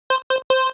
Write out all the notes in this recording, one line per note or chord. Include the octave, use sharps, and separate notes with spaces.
C5
C5
C5